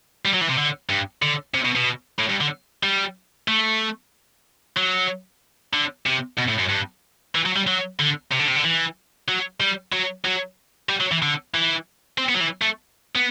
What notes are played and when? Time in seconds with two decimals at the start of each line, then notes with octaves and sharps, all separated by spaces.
0.25 G3
0.34 F#3
0.41 E3
0.49 C3
0.58 D3
0.89 G2
1.22 D3
1.55 C3
1.65 B2
1.76 B2
2.19 A2
2.29 G2
2.40 D3
2.83 G3
3.48 A3
4.77 F#3
5.73 D3
6.06 C3
6.38 B2
6.49 A2
6.59 F#2
6.70 G2
7.35 E3
7.46 F#3
7.56 G3
7.67 F#3
7.99 D3
8.31 C3
8.39 D3
8.48 C3
8.56 D3
8.64 E3
9.28 F#3
9.61 G3
9.93 F#3
10.25 F#3
10.89 G3
11.00 F#3
11.11 E3
11.22 D3
11.54 E3
12.18 C4
12.29 B3
12.35 F#3
12.40 E3
12.62 A3
13.16 B3